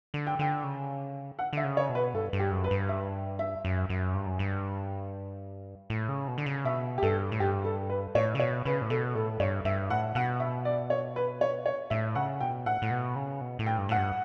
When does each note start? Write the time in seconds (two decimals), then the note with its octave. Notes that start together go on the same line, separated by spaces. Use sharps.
0.14 D3
0.27 G5
0.39 D3 G5
0.64 C#3
1.39 F#5
1.53 D3 E5
1.64 C#3
1.77 C#5
1.89 B2
1.95 B4
2.14 G2 A4
2.33 G2
2.40 G4
2.52 F#2
2.64 B4
2.71 G2
2.89 E5
3.39 E5
3.65 F#2
3.89 F#2
4.15 G2
4.26 F#2
4.39 G2
5.90 A2
6.09 C#3
6.28 B2
6.38 D3
6.46 C#3
6.65 B2 E5
6.98 G4
7.03 G2 A4
7.32 A2
7.40 G2 G4
7.64 A4
7.90 B4
8.15 A2 C#5
8.35 C#3
8.40 B2 C#5
8.65 C#3 B4
8.82 A2
8.90 B2 A4
9.15 A2 A4
9.40 G2 C#5
9.65 G2 E5
9.90 A2 F#5
10.15 B2 F#5
10.40 E5
10.65 D5
10.90 C#5
11.16 B4
11.41 C#5
11.66 C#5
11.90 A2 E5
12.15 C#3 F#5
12.41 B2 G5
12.66 A2 F#5
12.82 A2
12.91 B2
13.16 C#3
13.41 B2
13.59 A2
13.66 G5
13.78 G2
13.89 A2 F#5
13.97 G2